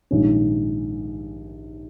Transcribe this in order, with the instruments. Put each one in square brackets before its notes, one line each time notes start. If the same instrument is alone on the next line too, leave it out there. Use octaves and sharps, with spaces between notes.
[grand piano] A#1 G#2 D#3 G3 C#4